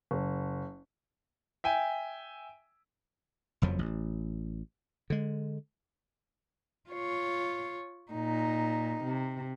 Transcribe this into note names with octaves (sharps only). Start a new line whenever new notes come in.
F#1
E5 G5 G#5
F#1 F2 F3 F#3
A1
D3 G#3
F4 C#5
A#2 D#4
C3